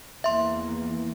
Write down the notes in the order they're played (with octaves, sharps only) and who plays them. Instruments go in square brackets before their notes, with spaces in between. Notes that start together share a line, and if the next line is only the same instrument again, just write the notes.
[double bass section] E2 E3 A#3 [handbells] E5 C6